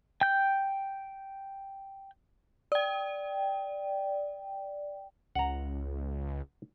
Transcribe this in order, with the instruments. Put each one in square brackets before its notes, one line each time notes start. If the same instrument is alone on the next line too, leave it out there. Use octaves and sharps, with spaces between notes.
[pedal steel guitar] G5 G6
[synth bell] D5 G5
[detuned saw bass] C#2 [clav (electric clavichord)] F#5 A#5